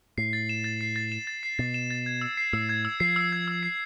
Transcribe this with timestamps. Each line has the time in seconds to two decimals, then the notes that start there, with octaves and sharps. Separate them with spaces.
0.18 A2 C7
0.33 A6
0.49 E7
0.64 A6
0.81 C7
0.96 A6
1.12 E7
1.27 A6
1.43 C7
1.59 B2 A6
1.74 E7
1.91 A6
2.06 G#6
2.21 E6
2.37 C7
2.53 A2 E6
2.69 G#6
2.85 E6
3.00 F3 C7
3.16 E6
3.32 G#6
3.48 E6
3.63 C7